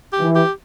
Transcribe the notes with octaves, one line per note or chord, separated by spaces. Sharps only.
G4
E3
G4